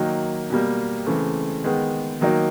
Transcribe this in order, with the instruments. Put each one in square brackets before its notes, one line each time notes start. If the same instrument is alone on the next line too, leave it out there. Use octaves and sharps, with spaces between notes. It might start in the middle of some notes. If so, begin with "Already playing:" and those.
Already playing: [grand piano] D#3 F#3 A#3 D#4
B2 G3 A#3
C#3 E3 A3 C4
D#3 G#3 B3
D#3 F#3 A#3 D#4